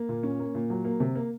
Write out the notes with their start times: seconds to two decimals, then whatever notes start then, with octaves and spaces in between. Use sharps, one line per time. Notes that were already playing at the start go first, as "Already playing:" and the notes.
Already playing: A#3
0.09 A#2
0.23 C#4
0.39 A#3
0.55 A#2
0.70 F#3
0.85 A#3
1.00 C3
1.15 A#3